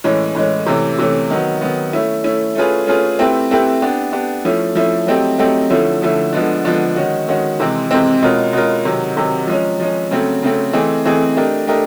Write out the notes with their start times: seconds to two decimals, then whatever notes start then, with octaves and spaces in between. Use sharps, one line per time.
0.04 A2 E3 G#3 C#4
0.35 A2 E3 G#3 C#4
0.66 C3 E3 A3 C#4
0.98 C3 E3 A3 C#4
1.30 D#3 F#3 B3
1.61 D#3 F#3 B3
1.93 A3 C#4 E4
2.24 A3 C#4 E4
2.55 A3 C#4 F4 G#4 B4
2.87 A3 C#4 F4 G#4 B4
3.19 A3 C4 E4 G4 B4
3.51 A3 C4 E4 G4 B4
3.82 B3 D4 G4
4.13 B3 D4 G4
4.45 F3 A3 C#4 E4
4.75 F3 A3 C#4 E4
5.07 F#3 A3 C4 D#4 G4
5.38 F#3 A3 C4 D#4 G4
5.70 D3 F3 A3 C#4 E4
6.02 D3 F3 A3 C#4 E4
6.33 D3 F3 G#3 B3 D4
6.65 D3 F3 G#3 B3 D4
6.96 D#3 G#3 C#4 F#4
7.28 D#3 G#3 C#4 F#4
7.60 C3 E3 G#3 C4
7.91 C3 E3 G#3 C4
8.22 B2 G#3 C#4 F4 A#4
8.53 B2 G#3 C#4 F4 A#4
8.85 C3 D#3 F#3
9.17 C3 D#3 F#3
9.47 F3 G#3 C#4
9.80 F3 G#3 C#4
10.11 C#3 F#3 A3 C4
10.43 C#3 F#3 A3 C4
10.73 E3 A3 C4 D#4 G#4
11.05 E3 A3 C4 D#4 G#4
11.37 A3 D4 G4 A#4 D#5
11.67 A3 D4 G4 A#4 D#5